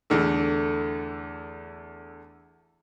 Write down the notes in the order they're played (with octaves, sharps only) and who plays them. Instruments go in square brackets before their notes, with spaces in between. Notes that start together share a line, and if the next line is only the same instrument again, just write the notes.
[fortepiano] E2 D3 A3